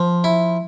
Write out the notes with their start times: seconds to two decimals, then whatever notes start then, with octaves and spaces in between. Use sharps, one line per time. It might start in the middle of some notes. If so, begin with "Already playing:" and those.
Already playing: F3
0.24 E4